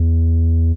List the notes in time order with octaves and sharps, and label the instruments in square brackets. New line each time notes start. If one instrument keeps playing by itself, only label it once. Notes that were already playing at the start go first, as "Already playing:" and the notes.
Already playing: [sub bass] E2